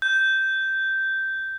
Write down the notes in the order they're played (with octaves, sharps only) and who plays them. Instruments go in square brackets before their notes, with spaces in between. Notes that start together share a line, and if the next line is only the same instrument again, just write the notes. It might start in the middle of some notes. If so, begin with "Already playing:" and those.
[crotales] G6